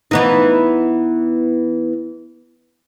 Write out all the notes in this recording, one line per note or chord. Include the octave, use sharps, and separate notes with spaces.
E3 B3 D#4